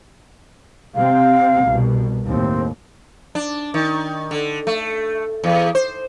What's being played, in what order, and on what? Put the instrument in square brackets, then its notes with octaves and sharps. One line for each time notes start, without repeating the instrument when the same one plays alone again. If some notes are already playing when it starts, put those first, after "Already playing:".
[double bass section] C3 C4 [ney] F5
[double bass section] C2 B2
[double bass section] D#2 A2 [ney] C4
[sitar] D4
D#3
D3
A3
E2
C5